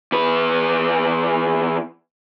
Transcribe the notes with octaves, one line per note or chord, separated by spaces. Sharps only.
E2 B4